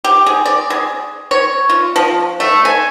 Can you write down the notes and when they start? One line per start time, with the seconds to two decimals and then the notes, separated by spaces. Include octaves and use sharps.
0.04 G4
0.26 G#4
0.45 D5
0.70 G#4
1.31 C#5
1.69 F4
1.96 F3
2.40 A3
2.65 G#5